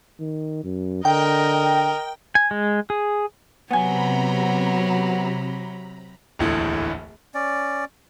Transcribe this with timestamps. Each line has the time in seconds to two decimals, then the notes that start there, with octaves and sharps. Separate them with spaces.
0.20 D#3
0.64 F#2
1.05 D3 A#4 D#5 G5
2.35 G#5
2.51 G#3
2.90 G#4
3.71 C3 F#3 B3 G#5 A#5 B5
6.39 D1 A#1 E2 A2 D3 E3
7.34 C#4 D5